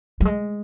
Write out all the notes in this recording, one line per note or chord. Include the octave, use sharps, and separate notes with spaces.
G3
G#3